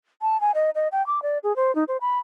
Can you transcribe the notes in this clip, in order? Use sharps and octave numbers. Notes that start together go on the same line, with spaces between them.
A5
G#5
D#5
D#5
G5
D6
D5
G#4
C5
D#4
C5
B5